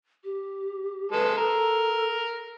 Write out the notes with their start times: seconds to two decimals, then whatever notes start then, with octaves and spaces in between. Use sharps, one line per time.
0.24 G4
1.12 G#3 A4 B4
1.37 A4 A#4